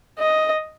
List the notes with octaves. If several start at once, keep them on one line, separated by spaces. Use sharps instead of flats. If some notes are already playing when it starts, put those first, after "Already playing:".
D#5